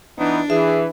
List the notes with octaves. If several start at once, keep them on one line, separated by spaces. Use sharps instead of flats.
E3 B3 D4 D#4
E3 G#4 E5